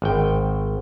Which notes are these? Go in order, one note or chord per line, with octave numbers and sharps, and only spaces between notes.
G#1 G5